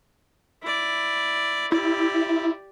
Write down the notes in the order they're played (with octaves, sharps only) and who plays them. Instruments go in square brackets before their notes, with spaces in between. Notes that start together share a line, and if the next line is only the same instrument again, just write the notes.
[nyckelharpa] E4 D5
[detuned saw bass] E4 [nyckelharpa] G4 D5